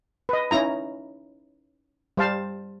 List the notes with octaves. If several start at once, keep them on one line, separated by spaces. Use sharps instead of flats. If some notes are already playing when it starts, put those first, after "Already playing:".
B4 D#5
C#4 D#4 E4 A#5
G3 C5 F5 A5